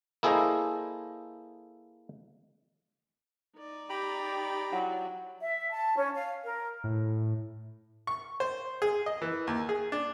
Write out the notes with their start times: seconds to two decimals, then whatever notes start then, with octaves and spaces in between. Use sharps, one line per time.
0.23 A#3 E4 G#4 A4 C5 D#5
3.57 D#4 D5
3.89 G4 G5 A#5 B5
4.72 F#3 E4 F#5
5.41 E5
5.72 A5
5.96 C#4
6.14 F5
6.44 A#4
6.84 A2
8.07 C#6
8.40 C5
8.82 G#4
9.06 D#5
9.22 E3
9.47 D#2
9.69 G#4
9.92 D4